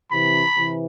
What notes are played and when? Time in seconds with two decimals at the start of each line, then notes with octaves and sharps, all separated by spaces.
0.11 C3 E3 B5
0.56 C3 E3